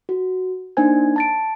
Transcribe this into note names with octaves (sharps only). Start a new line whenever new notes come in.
F#4
A#3 D4 D#4 C5 G#5 G#6
A5 A6 D7